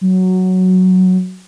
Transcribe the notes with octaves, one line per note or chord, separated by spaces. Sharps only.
F#3